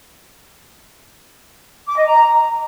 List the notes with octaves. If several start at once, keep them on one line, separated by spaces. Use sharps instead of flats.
D6
D#5
A#5